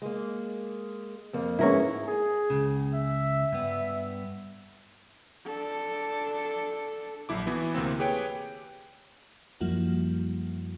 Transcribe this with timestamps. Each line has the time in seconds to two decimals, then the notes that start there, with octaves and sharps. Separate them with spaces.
0.02 G#3 A#3
1.33 F2 A#3
1.59 G#2 B3 C#4 E4 A#4 C#5
2.08 G#4
2.50 C#2 C#3
2.94 E5
3.52 G2 B3
5.46 D4 A4
7.29 A#1 F#3 E4 D6
7.46 E3 B3 E4 F#4
7.74 D2 C3 A#3 C4
7.99 G4 G#4 B4 C#5 G5
9.60 F#2 F3 G3 A#3 E4 F#4